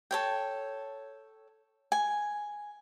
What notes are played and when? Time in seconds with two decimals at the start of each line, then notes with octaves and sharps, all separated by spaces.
0.11 A4 C#5 G5
1.92 G#5